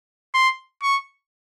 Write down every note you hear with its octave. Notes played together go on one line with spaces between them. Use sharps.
C6
C#6